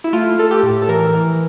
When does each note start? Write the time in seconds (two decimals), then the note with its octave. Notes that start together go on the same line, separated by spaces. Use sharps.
0.04 E4
0.13 A3 F4
0.38 A3 A4
0.51 G4
0.63 A2
0.82 A4
0.89 E3 A#4
1.14 E3